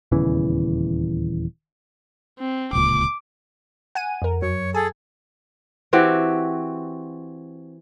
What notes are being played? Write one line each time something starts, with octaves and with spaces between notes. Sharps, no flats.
D#1 E2 C#3 E3
C4
D1 C#2 A#2 D6
F#5 G#5 D#7
F2 A#4
F#2 F#3 C#5
G#4 A4 G#5
E3 C4 F#4 G4